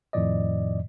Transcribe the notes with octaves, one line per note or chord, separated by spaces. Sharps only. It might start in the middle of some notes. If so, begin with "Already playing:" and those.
F2 A2 D#3 F3 D5 D#5